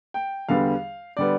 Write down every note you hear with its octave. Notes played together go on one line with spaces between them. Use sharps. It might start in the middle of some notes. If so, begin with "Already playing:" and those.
G5
E2 D3 G3 B3 F5
D3 G3 B3 D5